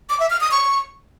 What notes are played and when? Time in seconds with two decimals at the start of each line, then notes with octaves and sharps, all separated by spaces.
0.10 D6
0.20 E5
0.30 F6
0.41 D#6
0.51 C#6